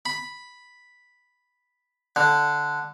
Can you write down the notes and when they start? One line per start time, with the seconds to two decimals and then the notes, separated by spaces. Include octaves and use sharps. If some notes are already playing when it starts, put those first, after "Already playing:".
0.06 B5
2.16 D3